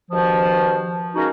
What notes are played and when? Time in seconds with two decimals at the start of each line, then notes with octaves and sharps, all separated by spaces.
0.11 G2 B2 D#3 F3
1.15 G#3 A#3 C#4 D#4 F#4